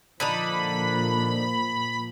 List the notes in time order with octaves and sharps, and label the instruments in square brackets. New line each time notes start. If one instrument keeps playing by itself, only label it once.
[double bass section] A#2 F3 A#3 [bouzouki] D3 D4 D#4 [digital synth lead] B5